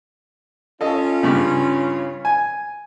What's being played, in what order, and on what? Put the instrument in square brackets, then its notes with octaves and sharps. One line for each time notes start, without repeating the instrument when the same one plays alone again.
[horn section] C#4 F4 [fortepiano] A4 D#5
[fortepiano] G2 C#3
G#5